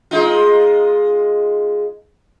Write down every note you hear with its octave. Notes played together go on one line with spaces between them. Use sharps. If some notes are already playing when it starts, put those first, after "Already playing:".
G#3 D#4 F4